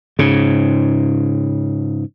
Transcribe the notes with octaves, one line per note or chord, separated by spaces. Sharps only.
G#2 C#3